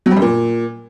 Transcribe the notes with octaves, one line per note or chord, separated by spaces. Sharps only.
F#3
G3
F#2
A#2